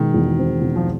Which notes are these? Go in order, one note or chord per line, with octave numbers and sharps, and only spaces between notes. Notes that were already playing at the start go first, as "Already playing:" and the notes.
Already playing: B2 D#3 G#3
E2
C4
B2
F3